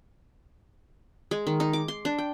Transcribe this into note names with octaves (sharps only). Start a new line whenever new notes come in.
G#3
D#3
D#4
D6
C6
D4
G5